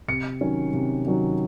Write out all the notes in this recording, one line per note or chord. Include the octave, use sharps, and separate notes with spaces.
C3 C#7
D#3 F#3 C#4
C3
D#3 F#3 C#4